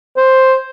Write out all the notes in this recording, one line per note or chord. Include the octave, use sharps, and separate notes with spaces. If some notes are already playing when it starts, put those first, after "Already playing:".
C5